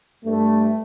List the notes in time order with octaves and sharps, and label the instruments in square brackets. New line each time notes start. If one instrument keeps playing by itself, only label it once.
[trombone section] G2 A3